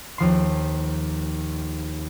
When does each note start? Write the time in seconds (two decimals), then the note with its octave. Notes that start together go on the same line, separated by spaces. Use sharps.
0.18 D#2 F3 C6